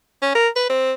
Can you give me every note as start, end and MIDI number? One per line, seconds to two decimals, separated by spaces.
0.22 0.32 61
0.35 0.48 70
0.56 0.65 71
0.70 0.93 60